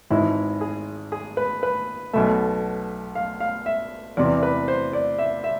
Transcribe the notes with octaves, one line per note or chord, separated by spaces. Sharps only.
G#1 G#2 E3 G#3 E4
G#4
G#4
B4
B4
B1 B2 A3 E5
F5
F5
E5
E2 C3 E3 D5
B4
C5
D5
E5
E5